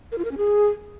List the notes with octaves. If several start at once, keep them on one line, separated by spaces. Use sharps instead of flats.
A#4
F4
A#4
C#4
G#4